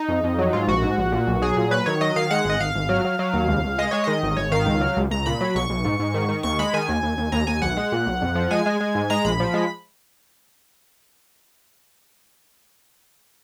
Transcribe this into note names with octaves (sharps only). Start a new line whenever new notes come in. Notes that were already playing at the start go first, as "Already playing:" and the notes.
Already playing: D#4
F2
F2
F#3
G#2 F4
A#1 F#4
G#2
A#1
A#2
B1
F#3 G#4
A#2
F#3 B4
D#3 C#5
F#3 D#5
D#3 F5
G#3 F#5
G#1 D#5
G#1 F5
G#1
F#3
F#3
F#3
D#2
C#2
C#2
G#3 D#5
G#3 C#5
D#3 D#5
G#1
G#1 C#5
D#3 F5
C#2
F#3
C#2
C#2 A#5
A#2 B5
F#3
B1 C#6
B1
G#2
G#2
D#3
D#3
D#2 C#6
G#3 B5
D#3 G#5
D#2
D#2
D#2
D#2 A#5
D#2 G#5
B1 F#5
G#3
A#2
B1
F2
F3
G#3 G#5
G#3
G#3
G#2
G#3 A#5
A#1 B5
F3
G#3